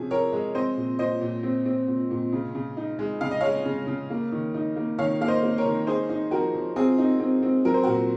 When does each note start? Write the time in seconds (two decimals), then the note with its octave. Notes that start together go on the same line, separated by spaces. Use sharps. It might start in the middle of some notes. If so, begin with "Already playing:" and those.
Already playing: C3 F3 C#4 G#4
0.11 F3 A#4 C#5
0.33 G#3
0.55 C4 C5 D#5
0.77 A#2
0.99 A#2 C5 D#5
1.21 A#2
1.43 C4
1.66 C4
1.88 A#2
2.11 A#2
2.33 C#3
2.55 C#3
2.77 D#4
2.99 G#3
3.21 C#3 F5
3.31 D#5
3.41 G#3 C#5 F5
3.66 C#3
3.87 C#3
4.10 A#3
4.32 D#3
4.54 D#4
4.76 A#3
4.98 D#3 C#5 F5
5.21 A#3 F5
5.28 C5 D#5
5.43 A#3
5.58 A#4 C#5
5.65 D#3
5.87 D#4 G#4 C5
6.09 D#4
6.31 F3 F#4 A#4
6.54 F3
6.76 C4 F4 G#4
6.98 D#4
7.20 C4
7.43 C4
7.65 F#3 A#4
7.74 C5
7.84 A#2 F#4 A#4